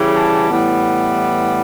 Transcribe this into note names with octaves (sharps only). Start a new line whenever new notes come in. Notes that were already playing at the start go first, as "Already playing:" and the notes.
Already playing: C#3 E3 G3
A5
A2 E3 G3 B3